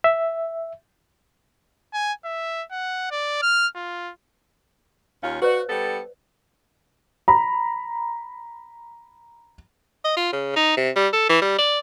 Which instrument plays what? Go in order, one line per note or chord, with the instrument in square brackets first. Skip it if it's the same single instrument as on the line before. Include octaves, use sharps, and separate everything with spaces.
[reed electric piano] E5
[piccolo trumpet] G#5
E5
F#5
D5
F6
F4
[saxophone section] D#2 C#4 F4 [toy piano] F5
[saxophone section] F#4 [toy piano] B4 C5 D5
[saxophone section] G3 B3 A4
[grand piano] A#5 B5
[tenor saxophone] D#5
F4
C#3
D#4
C3
G3
A4
E3
G3
D5